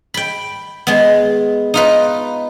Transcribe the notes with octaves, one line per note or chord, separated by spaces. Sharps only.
G5 B5
G#3 B3
D#4 F4 B4